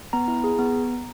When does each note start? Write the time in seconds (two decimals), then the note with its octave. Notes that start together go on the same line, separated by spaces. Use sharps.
0.13 B3 A#5
0.28 E4
0.44 G#4
0.59 B3